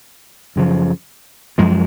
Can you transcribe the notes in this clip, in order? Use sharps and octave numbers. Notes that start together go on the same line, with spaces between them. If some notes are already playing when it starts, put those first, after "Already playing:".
F#2 C#3 F3
F#2 F3 G#3